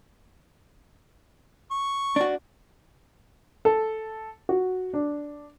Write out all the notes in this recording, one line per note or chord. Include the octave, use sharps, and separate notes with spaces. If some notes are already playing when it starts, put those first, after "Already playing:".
C#6
D4 F#4
A4
F#4
D4